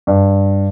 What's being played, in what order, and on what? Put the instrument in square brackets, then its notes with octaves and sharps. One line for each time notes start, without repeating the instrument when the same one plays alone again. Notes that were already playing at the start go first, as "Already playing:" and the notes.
[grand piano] G2